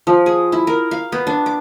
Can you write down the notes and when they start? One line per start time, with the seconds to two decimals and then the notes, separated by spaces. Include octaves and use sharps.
0.07 F3
0.26 G#4
0.52 E4
0.67 A#4
0.91 F5
1.12 B3
1.27 D4
1.46 D6